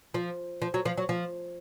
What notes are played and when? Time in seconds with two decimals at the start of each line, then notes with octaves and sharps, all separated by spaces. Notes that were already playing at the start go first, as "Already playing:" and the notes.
0.14 F3
0.62 F3
0.74 F#3
0.85 F3
0.97 F#3
1.09 F3